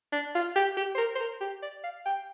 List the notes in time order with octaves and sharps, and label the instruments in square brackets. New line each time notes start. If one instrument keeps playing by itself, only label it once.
[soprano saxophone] D4
F4
G4
G4
C5
A#4
C5
A#4
G4
D5
F5
G5